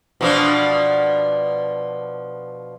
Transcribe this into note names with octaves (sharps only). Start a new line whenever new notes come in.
B2 F3 D4